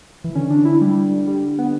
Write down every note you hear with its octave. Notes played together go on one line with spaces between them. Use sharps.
E3
D3 C#4
D4
E4
G3
G3
B3